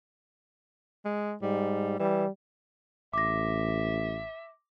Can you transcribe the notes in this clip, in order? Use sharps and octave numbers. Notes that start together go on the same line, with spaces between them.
G#3
G#2 G3
E3 G3
A1 E5 D6 A#6